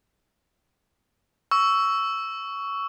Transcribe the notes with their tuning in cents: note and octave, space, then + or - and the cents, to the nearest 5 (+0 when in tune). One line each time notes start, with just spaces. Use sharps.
C#6 +15 E6 +0